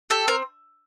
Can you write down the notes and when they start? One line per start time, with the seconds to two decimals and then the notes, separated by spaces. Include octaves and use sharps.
0.10 G4 A4
0.28 C4 A#4